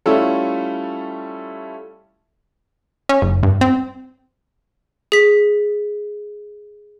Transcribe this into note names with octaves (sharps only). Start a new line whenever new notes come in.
G3 A3 C#4 E4 F4 A4
C#4
F#1
G2
C4
G#4 B6